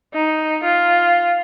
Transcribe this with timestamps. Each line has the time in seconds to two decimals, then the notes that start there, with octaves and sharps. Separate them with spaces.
0.14 D#4
0.64 F4